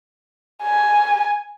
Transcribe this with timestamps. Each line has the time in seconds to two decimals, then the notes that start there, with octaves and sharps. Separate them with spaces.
0.64 G#5